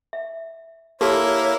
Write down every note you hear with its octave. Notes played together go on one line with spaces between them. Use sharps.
E5
A#3 E4 G4 A4 A#4 C#5 A5